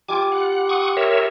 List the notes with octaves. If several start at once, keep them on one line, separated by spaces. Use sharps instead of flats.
G3 F4 G#5 D6
F#5
F#5 C#6 D#6
A#4 C#5 E5